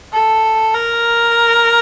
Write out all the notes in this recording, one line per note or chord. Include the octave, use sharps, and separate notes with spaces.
A4
A#4